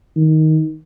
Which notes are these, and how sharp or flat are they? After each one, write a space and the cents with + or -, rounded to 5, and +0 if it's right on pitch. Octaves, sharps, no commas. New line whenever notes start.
D#3 +10